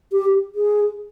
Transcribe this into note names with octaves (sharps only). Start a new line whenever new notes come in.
G4
G#4